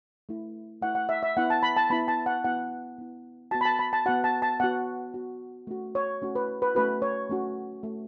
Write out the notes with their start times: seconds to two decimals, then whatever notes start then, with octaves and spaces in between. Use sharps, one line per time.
0.29 A3 E4
0.82 A3 E4 F#5
0.95 F#5
1.09 E5
1.23 E5
1.37 B3 E4 F#5
1.50 A5
1.63 B5
1.77 A5
1.90 B3 E4 B5
2.08 A5
2.26 F#5
2.44 B3 E4 F#5
2.98 B3 E4
3.51 B3 F#4 A5
3.61 B5
3.65 A5
3.79 B5
3.93 A5
4.06 F#4 F#5
4.09 B3
4.24 A5
4.42 A5
4.60 B3 F#4 F#5
5.14 B3 F#4
5.67 A3 C#4 F#4
5.95 C#5
6.22 A3 C#4 F#4
6.36 B4
6.62 B4
6.75 A3 C#4 F#4 B4
7.02 C#5
7.30 A3 C#4 F#4
7.83 A3 F#4